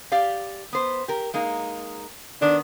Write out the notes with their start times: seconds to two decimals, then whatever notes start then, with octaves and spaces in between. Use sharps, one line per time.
0.12 G4 D5 F5
0.73 B3 C5
1.08 G4 A#4
1.34 G#3 A#3 D#4
2.42 D#3 B3 D4